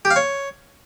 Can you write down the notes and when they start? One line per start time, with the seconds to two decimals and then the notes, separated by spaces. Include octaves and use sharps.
0.05 G4
0.10 F5
0.16 C#5